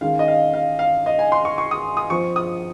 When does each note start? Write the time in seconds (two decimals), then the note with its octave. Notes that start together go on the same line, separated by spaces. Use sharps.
0.01 D#3 G#3 C#4 F5
0.19 D#5
0.28 F5
0.53 F5
0.79 F5
1.06 D#5
1.19 G#5
1.32 C6
1.45 C#6
1.58 C#6
1.71 D#6
1.97 D#6
2.10 F3 C4 C#6
2.36 D#6